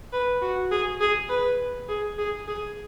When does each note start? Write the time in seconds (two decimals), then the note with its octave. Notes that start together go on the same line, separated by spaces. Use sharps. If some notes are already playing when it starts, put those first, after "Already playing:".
0.13 B4
0.42 F#4
0.71 G#4
1.01 G#4
1.30 B4
1.89 G#4
2.18 G#4
2.48 G#4